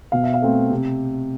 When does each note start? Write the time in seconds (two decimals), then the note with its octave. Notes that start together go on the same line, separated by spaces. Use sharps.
0.12 B2 F5
0.23 E5
0.34 F5
0.42 A3 C4
0.71 C3